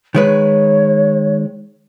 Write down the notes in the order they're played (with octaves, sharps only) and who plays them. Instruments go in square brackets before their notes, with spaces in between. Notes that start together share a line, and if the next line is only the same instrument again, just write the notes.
[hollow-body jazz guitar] D#3 G#3 B4 [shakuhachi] C#5